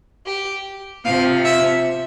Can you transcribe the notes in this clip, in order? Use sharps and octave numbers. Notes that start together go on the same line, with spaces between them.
G4
C3 F3 F5
E5